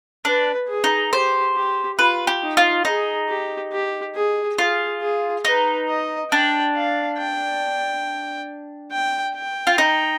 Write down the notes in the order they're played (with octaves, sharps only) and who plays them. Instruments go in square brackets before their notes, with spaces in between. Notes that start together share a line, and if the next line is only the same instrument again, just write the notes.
[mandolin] D4 [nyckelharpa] B4
[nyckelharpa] G#4
[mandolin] D#4
[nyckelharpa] G4 [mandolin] C5
[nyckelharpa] G4
[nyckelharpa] F4 [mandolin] B4
[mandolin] G4
[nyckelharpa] D#4
[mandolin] F4
[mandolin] D#4 [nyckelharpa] G#4
[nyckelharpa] G4
G4
G#4
[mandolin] F4 [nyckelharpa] G#4
[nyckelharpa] G#4
[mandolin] D#4 [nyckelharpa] B4
[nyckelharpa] D#5
[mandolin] D4 [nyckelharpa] G5
[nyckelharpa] F5
G5
G5
G5
[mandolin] F4
D#4